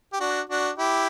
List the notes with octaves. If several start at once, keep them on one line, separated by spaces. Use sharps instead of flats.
G4
D4 F#4
D4 F#4
E4 G4